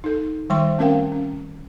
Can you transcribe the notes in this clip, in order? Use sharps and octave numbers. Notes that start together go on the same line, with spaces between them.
D#4 A4
D#3 G3 C5 G5 C6
A3 C4 C#4 A#4 F5 G5
C#4